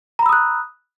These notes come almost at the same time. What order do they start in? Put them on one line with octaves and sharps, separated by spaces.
A#5 B5 E6 D#6 F#6